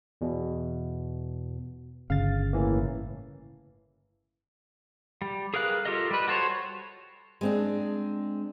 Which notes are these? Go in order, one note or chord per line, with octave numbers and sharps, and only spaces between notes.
E2 B2
G1 C#3 F5 A6
A2 E3 A#3
G3
G#4 A#4 B4 F5 F#6
F4 G4 A4 A#4 D#5
G3 B4
F#4 A4 C5 C#5
G#3 C4 D4